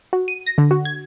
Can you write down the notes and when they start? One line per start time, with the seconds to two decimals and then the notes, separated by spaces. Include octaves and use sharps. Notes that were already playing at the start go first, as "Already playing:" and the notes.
0.13 F#4
0.28 D#7
0.46 A#6
0.58 D3
0.71 F#4
0.85 G#6